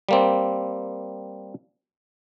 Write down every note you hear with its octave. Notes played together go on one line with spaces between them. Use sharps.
G3 A#3 C4